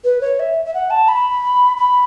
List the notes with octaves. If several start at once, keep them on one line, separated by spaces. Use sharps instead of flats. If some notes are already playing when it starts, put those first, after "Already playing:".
B4
C#5
E5
E5
F#5
A5
B5
B5